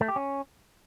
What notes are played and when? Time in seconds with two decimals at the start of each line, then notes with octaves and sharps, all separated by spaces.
0.01 A3
0.08 G4
0.16 C#4